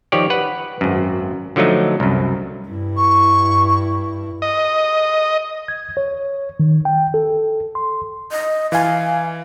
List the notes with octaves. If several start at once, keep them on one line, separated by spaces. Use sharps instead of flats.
D#3 F3 G4 C#5 D5
B4 F#5
G#1 F#2
D3 F3 F#3 A3 D#4
C2 F#2
G2 E4
C#6
D#5
G#6
C#5
D#3
G5
A4
C6
D#5
E3 F5 G#5